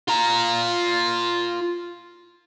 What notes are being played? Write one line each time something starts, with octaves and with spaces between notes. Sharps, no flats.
F4 A#5